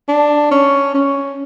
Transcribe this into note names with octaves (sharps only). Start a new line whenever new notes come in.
D4
C#4
C#4